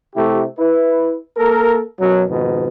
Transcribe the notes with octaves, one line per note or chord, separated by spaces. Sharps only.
C3 A3 E4 G4
E4 B4
A#3 A4 A#4
F#2 B2 F#3
F2 G#2 B2 D#3